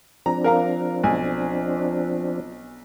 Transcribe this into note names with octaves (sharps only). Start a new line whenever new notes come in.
F3 C4 D4 A#5
A#4 F5 A#5
B1 G#5